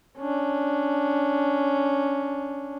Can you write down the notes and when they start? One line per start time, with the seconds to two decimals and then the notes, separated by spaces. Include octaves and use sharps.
0.18 C#4 D4